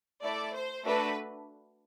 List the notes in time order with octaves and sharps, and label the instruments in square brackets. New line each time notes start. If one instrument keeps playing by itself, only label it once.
[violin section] A3 E4 A4 D5
C5
A3 D4 F#4 A4 B4